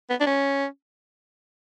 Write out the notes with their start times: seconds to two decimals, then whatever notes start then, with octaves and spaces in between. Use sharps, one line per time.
0.10 B3
0.20 D4
0.26 C#4